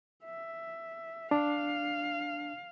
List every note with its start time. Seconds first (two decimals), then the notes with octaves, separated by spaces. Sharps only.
0.25 E5
1.31 D4 F5